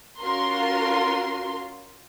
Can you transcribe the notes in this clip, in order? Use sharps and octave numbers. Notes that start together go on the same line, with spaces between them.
C#4 F4 F#4 A#4 C6